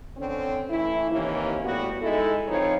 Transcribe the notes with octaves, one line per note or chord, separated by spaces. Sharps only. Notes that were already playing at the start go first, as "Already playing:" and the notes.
D3 C4 C#4
E3 A3 E4
D#2 C3 E3 A#3 C#4
A2 G3 B3 F#4
G#3 D#4 E4 A4
F3 C4 D#4 B4 C#5